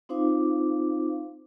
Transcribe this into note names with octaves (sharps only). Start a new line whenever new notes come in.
C4 D#4 F4 C5 F5 D6